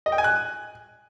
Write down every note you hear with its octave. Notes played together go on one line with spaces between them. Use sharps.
D#5
G5
G#5
F#6